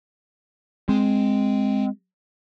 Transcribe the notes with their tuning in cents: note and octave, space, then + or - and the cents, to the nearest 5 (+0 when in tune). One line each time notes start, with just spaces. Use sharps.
G#3 +0 C4 +0